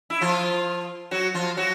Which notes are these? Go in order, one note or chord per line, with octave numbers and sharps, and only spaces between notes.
E4
F3 F4
F#3 F#4
F3 F4
F#3 F#4